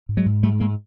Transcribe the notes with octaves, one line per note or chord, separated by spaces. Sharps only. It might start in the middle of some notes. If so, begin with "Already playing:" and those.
G#2
F#3 G#3
G#2
G#2 G3 A3
G#2 G#3 A#3